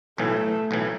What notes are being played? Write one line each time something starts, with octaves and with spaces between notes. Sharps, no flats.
B1 A2 E3 A3
B1 A2 E3